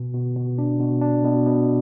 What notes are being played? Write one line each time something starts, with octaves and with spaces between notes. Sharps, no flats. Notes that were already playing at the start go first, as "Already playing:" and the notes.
Already playing: B2
B2
B2
D4
B2
D4
B2
B2